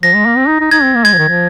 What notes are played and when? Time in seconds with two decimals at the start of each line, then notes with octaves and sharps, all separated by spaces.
0.03 F3 A#6
0.15 G#3
0.26 A#3
0.37 C4
0.48 D#4
0.60 D#4
0.71 D#4 G#6
0.83 C4
0.95 A#3
1.05 G#3 G#6
1.13 F3
1.17 D#3
1.28 F3